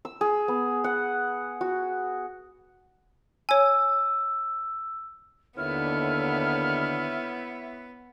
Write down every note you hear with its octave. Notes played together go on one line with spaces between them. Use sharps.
E6
G#4
B3
F#5
F#4
C#5 G#5 E6
D#2 D3 B3 E4 C#5 E5 F6